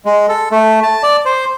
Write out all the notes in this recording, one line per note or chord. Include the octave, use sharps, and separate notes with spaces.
G#3
A4
A3
A5
D5
C5